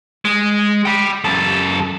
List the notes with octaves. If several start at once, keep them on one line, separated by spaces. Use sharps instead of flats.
G#3
G5 B5
F#2 A4